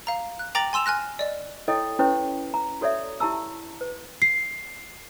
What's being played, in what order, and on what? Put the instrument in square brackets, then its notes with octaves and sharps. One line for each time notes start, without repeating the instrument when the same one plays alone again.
[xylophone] F5 A#5
F#6
G5 A#5 D6 A6 A#6 F#7
G#5 C6 E6 E7 F7
G#5 F6 F#6 A#6
D5 D#5
[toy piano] E4 A4 C#5 D#5 G5
C#4 E4 G4 B4 C#5
A#5
F#4 A4 C#5 D5 E5
E4 G4 A5 A#5 E6
B4
[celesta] C7